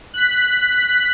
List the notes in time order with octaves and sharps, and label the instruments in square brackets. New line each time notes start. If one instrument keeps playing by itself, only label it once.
[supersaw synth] F#6 B6